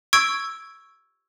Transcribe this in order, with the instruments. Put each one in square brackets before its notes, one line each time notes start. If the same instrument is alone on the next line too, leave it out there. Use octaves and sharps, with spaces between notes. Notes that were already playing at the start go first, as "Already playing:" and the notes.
[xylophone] C#6 E6 G#6 D7